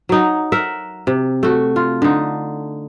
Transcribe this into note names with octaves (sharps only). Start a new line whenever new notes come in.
F#3 D#4
A#4 E5 F#5
C3
A3 F#4
F4
D3 D#4